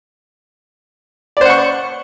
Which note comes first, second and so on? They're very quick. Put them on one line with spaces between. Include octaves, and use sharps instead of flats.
D5 C5 F#5 C#6